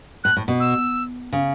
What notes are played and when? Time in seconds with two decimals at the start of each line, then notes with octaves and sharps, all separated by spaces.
0.24 A2 F#6
0.37 A2
0.48 B2
0.60 E6
1.32 C#3